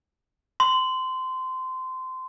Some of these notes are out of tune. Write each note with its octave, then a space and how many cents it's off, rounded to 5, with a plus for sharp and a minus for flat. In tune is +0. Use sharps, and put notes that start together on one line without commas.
C6 -20